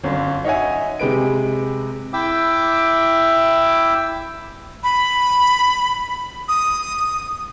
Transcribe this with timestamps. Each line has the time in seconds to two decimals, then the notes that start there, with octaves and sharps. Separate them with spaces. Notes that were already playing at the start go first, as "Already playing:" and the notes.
0.04 G1 F#2
0.45 D#4 C#5 E5 F#5 G#5
0.99 C3 G#3 G4 B4 D7
2.13 E4 E5 G5 D6 E6
4.83 B5
6.48 D#6